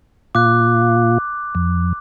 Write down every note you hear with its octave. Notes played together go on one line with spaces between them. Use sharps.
A#2 F4 D6 F#6
F2